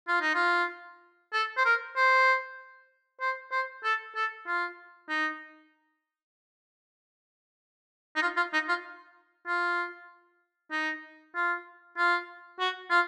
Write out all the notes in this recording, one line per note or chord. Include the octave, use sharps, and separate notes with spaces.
F4
D#4
F4
A4
C5
A#4
C5
C5
C5
A4
A4
F4
D#4
D#4
F4
F4
D#4
F4
F4
D#4
F4
F4
F#4
F4